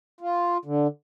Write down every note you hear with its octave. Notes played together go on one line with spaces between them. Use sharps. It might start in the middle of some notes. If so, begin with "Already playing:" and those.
F4
D3